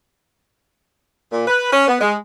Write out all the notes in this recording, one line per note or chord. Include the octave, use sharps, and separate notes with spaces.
A#2
B4
C#4
B3
G#3